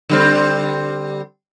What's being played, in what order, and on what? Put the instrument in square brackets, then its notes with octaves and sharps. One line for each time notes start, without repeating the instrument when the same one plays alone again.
[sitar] D3 G3 C4